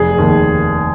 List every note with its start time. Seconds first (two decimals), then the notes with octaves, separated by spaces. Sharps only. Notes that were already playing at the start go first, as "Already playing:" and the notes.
Already playing: F1 G#4
0.18 D#2